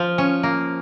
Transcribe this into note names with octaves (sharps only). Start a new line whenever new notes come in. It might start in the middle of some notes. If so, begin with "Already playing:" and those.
Already playing: F3
C#4
A#3